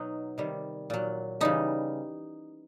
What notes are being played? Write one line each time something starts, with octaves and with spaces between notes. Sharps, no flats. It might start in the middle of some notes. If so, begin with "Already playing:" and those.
Already playing: B2 F#3 D#4
C3 D#3 G3
A#2 F#3
C#3 E3 G3 D#4